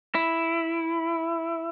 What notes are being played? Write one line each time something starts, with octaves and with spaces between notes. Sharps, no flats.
E4